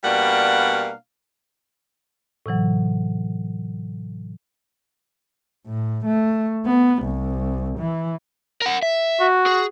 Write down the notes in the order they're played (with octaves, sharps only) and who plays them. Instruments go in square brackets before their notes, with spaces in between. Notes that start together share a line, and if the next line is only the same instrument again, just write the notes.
[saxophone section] B2 G3 A#3 D4 F5 F#5
[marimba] A2 C3 E3 F#3
[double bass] A2
A3
B3
C2
E3
[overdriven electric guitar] A#4 F#5
E5
[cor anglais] F#4
[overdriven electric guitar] G#4